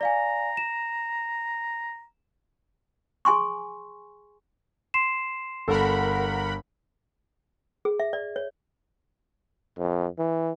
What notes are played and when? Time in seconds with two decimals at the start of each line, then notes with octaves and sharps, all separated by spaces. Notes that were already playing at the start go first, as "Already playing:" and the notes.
0.01 D5 F5 G#5 A#5
0.57 E7
3.25 G#4 G#5 C6 C#6
4.94 C6 C7 E7
5.68 G1 A4 A#4 F#5 B5
7.85 G#4
8.00 E5
8.13 D5
8.36 C#5
9.78 F2
10.18 E3